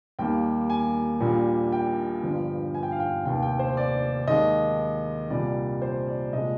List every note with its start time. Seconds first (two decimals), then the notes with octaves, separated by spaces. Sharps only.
0.19 D#2 D#3 G3 A#3 G5
0.70 G#5
1.20 A#1 A#2 G3
1.72 G5
2.23 G1 G2 F3
2.74 G#5
2.83 G5
2.92 F5
3.00 G5
3.25 F1 D#2 D#3 G5
3.43 G5
3.59 C5
3.77 D5
4.27 D#2 D#3 G#3 D#5
5.30 C2 A#2 G3 D5
5.82 C5
6.08 D5
6.32 C2 A#2 G#3 D#5